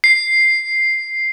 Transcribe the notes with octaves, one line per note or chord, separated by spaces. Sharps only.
C7